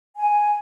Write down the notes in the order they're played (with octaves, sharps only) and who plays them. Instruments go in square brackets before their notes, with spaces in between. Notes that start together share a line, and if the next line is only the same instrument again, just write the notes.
[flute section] G#5